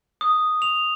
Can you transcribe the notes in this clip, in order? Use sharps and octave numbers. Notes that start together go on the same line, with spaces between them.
D#6
F7